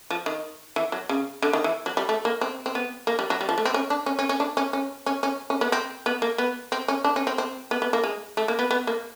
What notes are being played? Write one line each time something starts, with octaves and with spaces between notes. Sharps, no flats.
F3
D#3
E3
F#3
C#3
D3
D#3
E3
F#3
G3
A3
A#3
C4
C4
B3
A#3
G3
F#3
G3
F3
A3
C4
C#4
D4
C#4
C#4
C#4
D4
C#4
C#4
C#4
C#4
C#4
B3
C4
B3
A#3
B3
C4
C#4
D4
C#4
C4
C4
B3
B3
A#3
G#3
A3
A#3
B3
B3
A#3